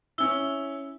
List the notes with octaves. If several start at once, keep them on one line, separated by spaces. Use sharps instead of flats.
C#4 E4 E6 G7